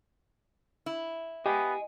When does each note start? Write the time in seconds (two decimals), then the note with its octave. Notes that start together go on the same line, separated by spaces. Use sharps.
0.86 E4
1.46 B3 G4 D#5 G#5